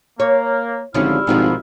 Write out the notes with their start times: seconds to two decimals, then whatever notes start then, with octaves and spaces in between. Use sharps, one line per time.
0.20 A#3 C#5
0.94 G#1 D3 F3 G3 C#4 E4 F6
1.27 G#1 B2 D#3 F3